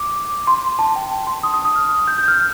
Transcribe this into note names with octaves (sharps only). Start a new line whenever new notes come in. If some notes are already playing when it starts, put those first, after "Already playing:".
Already playing: D6
C6
A5
G5
A5
C6
D#6
D#6
D#6
F6
G6
G6
F6